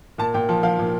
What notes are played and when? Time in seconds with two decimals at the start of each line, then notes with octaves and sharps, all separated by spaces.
0.18 A#2 A5
0.34 A#2 G5
0.49 F3
0.63 F3 F5
0.79 A#2